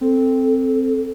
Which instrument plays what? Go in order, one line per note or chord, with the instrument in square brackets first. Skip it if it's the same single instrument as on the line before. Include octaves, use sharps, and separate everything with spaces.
[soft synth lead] C4 [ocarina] A4